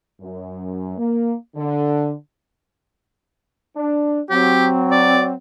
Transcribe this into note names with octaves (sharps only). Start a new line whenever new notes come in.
F#2
A#3
D3
D4
F#3 C4 G4
D5